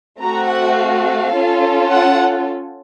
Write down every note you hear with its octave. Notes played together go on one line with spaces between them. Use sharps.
A3 C4 F#4 A#5
F#5
F5
C#4 F4 A4
F#5